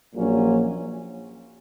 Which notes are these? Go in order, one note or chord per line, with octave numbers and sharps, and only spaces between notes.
A#1 A#2 F#3 A#3 C#4